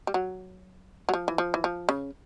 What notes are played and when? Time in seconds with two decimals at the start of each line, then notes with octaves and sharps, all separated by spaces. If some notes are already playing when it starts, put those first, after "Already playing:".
0.07 G3
0.14 F#3
1.09 F#3
1.14 F3
1.28 E3
1.38 F3
1.54 E3
1.64 F3
1.89 C#3